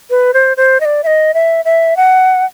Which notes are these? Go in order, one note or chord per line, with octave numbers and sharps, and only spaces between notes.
B4
C5
C5
D#5
D5
E5
D#5
E5
E5
F#5